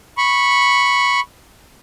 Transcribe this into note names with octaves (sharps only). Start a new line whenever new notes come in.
B5 C#6